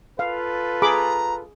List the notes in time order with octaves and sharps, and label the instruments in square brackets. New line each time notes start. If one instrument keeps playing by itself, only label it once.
[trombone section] F4 A4 B4 [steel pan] F5
[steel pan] G#4 B5 D6 [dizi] A#5